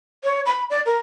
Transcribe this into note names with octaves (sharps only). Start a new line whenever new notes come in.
C#5
B5
D5
A#4